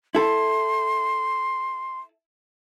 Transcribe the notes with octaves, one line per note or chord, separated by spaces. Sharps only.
E4 A4 C6